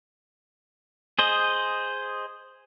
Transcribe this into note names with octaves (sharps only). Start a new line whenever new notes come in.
G#4 C5 D#5